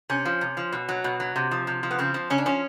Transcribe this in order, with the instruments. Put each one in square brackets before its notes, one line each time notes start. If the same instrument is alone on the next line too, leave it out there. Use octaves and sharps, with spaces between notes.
[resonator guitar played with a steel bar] C3 C#4
F3
C3
F3
B2
F#3
B2
F#3
C3
F3
C3
F3
B3
C#3 C4
F3
C#3 C#4
D4
F3 C#4